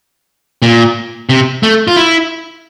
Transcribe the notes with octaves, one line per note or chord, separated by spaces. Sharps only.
A#2
C3
A3
F4
E4